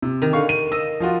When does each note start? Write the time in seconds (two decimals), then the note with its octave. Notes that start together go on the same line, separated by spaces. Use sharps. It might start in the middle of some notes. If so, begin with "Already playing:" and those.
0.02 C3
0.22 D#3
0.33 D3 F5 C#6
0.49 D#7
0.72 D#5 E6
1.00 F3 F4 F#4